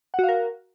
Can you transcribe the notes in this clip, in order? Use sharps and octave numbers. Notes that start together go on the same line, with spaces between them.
F#4 A#4 F5 F#5